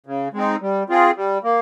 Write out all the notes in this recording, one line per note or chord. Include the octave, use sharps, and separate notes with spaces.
C#3
G#3 C4 D#4
G3
C4 F4 G#4
G3
A#3